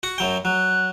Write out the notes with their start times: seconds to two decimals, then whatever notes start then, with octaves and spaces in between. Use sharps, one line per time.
0.03 F#4 F#5
0.18 F#2 F#3 G5
0.45 F#3 F#6